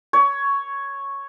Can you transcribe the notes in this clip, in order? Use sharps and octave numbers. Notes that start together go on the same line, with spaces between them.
C#5